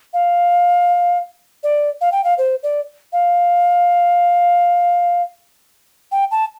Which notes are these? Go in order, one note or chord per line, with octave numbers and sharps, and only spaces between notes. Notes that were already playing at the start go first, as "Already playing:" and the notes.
F5
D5
F5
G5
F5
C5
D5
F5
G5
A5